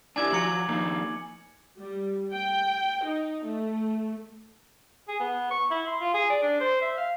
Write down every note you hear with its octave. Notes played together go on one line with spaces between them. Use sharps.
D4 E4 G4 G#5 D6 G#6
F3 F#4 G#5 A#5 C#7 F#7
F3 A#3 D#4
G3
G5
D#4
A3
G#4
B3
C#6
E4
C6
F4
G#4
D5
D4
C5
E5
F5